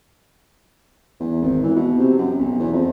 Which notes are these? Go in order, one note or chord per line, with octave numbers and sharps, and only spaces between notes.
E2
G#1
E3
B2
C3
F#2
B1
E2
F2